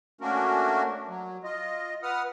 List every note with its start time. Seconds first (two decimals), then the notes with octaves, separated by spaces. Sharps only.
0.21 A3 A#3 C#4 D4 F#4 A#4
1.08 F#3
1.44 F4 D#5
2.03 B4 F#5 D#6 F6